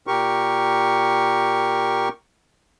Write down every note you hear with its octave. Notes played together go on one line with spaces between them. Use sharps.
A#2 G4 A#4 C#6